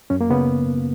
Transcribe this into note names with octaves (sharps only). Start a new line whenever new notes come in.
F#2 C#4
A#3
C#3 B3